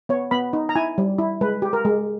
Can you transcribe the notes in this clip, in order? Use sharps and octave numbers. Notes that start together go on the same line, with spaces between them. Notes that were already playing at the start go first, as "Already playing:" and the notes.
B3 C#5
B3 B5
D#4
A#5
E4 G#5
G3
E4
G#3 B4
G4
A#4
G#3